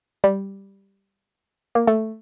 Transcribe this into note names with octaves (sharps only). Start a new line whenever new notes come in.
G3
A#3
A3